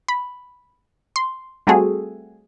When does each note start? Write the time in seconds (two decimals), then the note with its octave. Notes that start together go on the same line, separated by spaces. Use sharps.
0.08 B5
1.16 C6
1.67 G3 A3 C4 F#4 G#4 A4